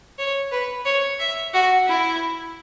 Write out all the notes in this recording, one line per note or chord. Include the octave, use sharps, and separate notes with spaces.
C#5
B4
C#5
E5
F#4
E4